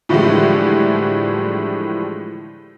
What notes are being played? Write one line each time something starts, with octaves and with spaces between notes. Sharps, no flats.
A2 D3 E3 F3 G3 G#3